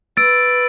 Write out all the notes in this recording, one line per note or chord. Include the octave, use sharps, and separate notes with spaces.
B4 E6 A6 D7